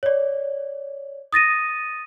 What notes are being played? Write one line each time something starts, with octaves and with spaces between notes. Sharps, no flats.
C#5 D5
D#6 A6 A#6 D#7